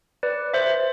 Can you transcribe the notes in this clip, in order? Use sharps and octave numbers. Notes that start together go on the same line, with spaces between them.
B4 D5
C5 E5